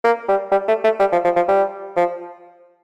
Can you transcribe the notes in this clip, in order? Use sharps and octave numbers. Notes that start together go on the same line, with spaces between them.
A#3
G3
G3
A3
A3
G3
F3
F3
F3
G3
F3